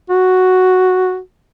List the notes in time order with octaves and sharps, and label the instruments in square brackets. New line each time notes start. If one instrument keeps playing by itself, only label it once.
[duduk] F#4